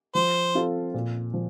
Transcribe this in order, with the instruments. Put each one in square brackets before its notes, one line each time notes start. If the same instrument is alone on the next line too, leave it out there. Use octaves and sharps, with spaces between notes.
[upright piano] F3 [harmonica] C5
[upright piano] C4 F4 A4
A#2
F3